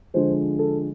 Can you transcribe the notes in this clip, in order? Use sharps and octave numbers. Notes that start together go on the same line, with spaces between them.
D3 F3 G#3 C5
A4